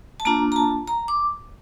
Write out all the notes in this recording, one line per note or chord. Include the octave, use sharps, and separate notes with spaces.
A5
A#3 D4 F4 A#5
A#5
A5
A#5
D6